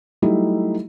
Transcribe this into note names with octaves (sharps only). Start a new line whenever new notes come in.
F#3 G3 A3 D#4 E4